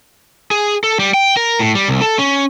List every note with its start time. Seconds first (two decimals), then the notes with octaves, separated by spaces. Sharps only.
0.51 G#4
0.84 A4
0.99 G3
1.14 G5
1.37 A#4
1.59 A2
1.75 G3
1.88 C2
2.01 A4
2.19 C#4